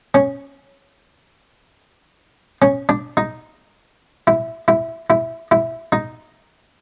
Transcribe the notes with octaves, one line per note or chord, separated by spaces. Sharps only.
C#4
C#4
D4
D#4
E4
E4
E4
E4
D#4